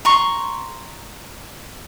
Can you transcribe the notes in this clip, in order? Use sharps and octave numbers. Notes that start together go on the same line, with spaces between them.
A#5 C6 C#6